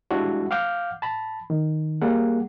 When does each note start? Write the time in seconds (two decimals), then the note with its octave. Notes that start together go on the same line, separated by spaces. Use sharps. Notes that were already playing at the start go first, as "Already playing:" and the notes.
0.11 G3 G#3 D4 E4 F#4
0.51 F5 F#5 D6 F6 G6
1.02 A5 B5
1.50 D#3
2.01 G3 A#3 G#4 F#5